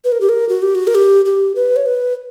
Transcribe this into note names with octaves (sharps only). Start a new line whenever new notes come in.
B4
A#4
G4
A#4
F#4
G4
F#4
A#4
G4
G4
B4
C#5
B4